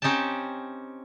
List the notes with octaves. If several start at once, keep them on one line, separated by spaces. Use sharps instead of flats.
C4 C#4 D#4 G4 G5 A5